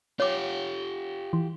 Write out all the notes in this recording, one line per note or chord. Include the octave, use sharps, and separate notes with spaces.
F4 G4 C#5 D6
E3